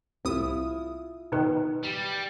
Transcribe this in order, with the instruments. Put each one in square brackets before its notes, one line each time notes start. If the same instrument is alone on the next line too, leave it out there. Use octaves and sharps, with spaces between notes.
[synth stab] C2 D#6 [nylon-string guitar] E4 F4
[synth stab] B2 D#3 [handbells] D#4 B4
[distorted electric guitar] G3